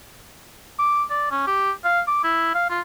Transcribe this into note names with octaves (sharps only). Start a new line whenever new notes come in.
D6
D5
C#4
G4
F5
D6
E4
F5
F4